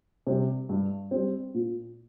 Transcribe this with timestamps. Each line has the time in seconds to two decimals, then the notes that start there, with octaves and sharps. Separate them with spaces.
0.27 C3 G3
0.69 G2
1.11 G3 C4
1.54 A#2